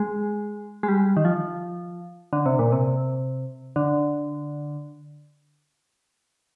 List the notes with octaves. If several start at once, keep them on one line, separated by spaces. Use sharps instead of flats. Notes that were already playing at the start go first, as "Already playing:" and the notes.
Already playing: G#3
G#3
G3
D#3
F3
D3
C3
A#2
C3
D3